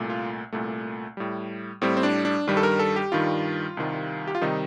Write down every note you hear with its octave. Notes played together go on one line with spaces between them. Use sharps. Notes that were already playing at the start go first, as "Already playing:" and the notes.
Already playing: C2 A#2 A3
F4
C2 A#2 A3
A2 G3
A2 G3 C4
C4
D4
D4
G2 D#3 G3
A4
A#4
A4
G4
G2 D#3 G3 F4
C2 C3 D#3 G3
G4
F4
C3 D#3 G3 D#4